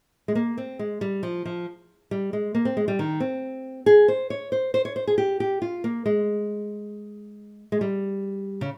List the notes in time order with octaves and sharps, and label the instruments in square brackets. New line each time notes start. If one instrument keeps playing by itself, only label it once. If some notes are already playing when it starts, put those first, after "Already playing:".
[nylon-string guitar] G#3
A#3
C4
G#3
G3
F3
F3
G3
G#3
A#3
C4
G#3
G3
D#3
C4
G#4
C5
C#5
C5
C5
C#5
C5
G#4
G4
G4
F4
A#3
G#3
G#3
G3
C#3